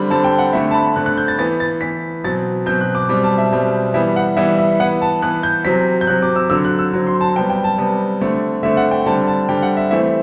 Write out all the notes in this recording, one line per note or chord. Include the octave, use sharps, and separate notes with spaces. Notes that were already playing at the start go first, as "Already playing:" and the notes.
Already playing: D3 G3 C4 B5
D3 G3 C4 A5
G5
F#5
D3 A3 C4 E5
A5
B5
D3 A3 C4 F#6
F#6
G6
A6
E3 B3 A6
A6
E3 B3 B6
B2 F#3 C4 A6
B2 F#3 C4 G6
F#6
D6
B2 G3 C4 D6
A5
E5
B2 G3 C4
E3 G3 B3 E5
F#5
E3 G3 B3 E5
E5
E3 B3 F#5
A5
E3 B3 F#6
G6
C3 F#3 C4 B6
G6
C3 F#3 C4 F#6
D6
E6
D3 F#3 C4 E6
F#6
E6
D3 F#3 C4
C6
A5
C3 G3 B3 G5
G5
A5
C3 G3 B3
D3 A3 C4
D3 A3 C4 E5
F#5
G5
D3 G3 C4 A5
A5
D3 G3 C4 G5
F#5
E5
E3 A3 C4 E5